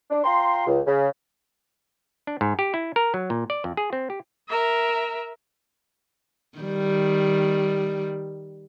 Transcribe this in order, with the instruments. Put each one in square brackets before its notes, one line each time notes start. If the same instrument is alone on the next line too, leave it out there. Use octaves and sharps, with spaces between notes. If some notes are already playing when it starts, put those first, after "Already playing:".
[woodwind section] D4
F4 G5 A#5 C6
C#2
C#3
[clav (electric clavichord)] D4
G#2
G4
E4
A#4
F#3
A#2
D5
F2
G#4
C4
G4
[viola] A#4 E5
[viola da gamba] D#3 G3